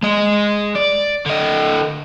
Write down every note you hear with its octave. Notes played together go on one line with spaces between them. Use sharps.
G#3 D#5
D5
D3 D#5